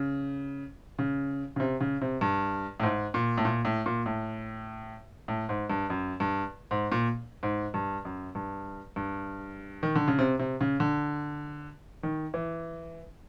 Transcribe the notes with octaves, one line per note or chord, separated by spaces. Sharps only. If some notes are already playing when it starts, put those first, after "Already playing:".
Already playing: C#3
C#3
C#3
C3
C#3
C3
G2
A2
G#2
A#2
A2
A#2
A2
A#2
A2
A2
G#2
G2
F#2
G2
G#2
A#2
G#2
G2
F#2
G2
G2
D#3
D3
C#3
C3
C3
C#3
D3
D#3
E3